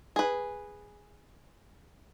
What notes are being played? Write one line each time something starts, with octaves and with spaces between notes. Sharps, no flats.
G#4 B4